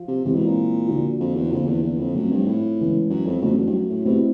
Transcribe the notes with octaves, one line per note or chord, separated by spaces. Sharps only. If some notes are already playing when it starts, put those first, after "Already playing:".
Already playing: F3
C3
C3 E3 G#3 C4 E4
B2
A#2
D3 F3 A#3 D4 F#4
F2
E2
F2 D3 F3 A#3
E2
E2
F2
F#2 F3 A3 C4
G2
A2
C#3 E3 G#3 B3
F#2
F2
F2 F#3 A3 C#4 F#4
E2
G2
F#2
A2
B2 A3 C4 E4 G4